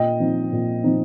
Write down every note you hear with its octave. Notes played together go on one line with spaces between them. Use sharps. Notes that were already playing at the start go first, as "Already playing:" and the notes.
Already playing: A#2 D#5 G5
F3 C4 D#4
A#2
F3 C4 D#4